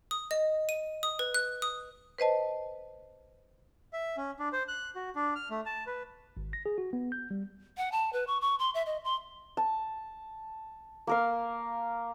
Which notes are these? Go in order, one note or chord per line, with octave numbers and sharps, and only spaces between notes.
D#6
D#5
D#7
D#6
B4
F#6
D#6
B4 C5 D#5 A5
E5
C#4
D4
C5
F#6
F#4
D4
F6
A3
A5
B4
G#1
A#6
G#4
F#4
B3
G6
G3
F#5
A5
B4
C#6
C#6
C6
E5
D#5
C6
A5
A#3 A#4 F5